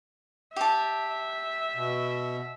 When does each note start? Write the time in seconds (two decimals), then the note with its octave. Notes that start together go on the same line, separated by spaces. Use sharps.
0.56 G4 E5 A5
1.75 B2